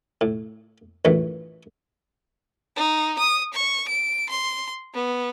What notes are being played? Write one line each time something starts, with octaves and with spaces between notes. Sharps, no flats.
A2
A#1 F#2 A2 E3
D#4
D#6
C#6
D7
C6
B3